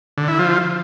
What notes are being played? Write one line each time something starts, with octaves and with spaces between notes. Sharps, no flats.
D3
E4
F3